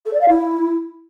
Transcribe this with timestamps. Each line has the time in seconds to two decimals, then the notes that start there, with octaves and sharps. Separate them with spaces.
0.05 A4
0.13 D5
0.21 F5
0.28 E4